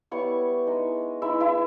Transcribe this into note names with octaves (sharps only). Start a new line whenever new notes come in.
G3 B3 E4 C#5 C#6
G#3 D#4
G#3 D#4 E4 E5
E4 E5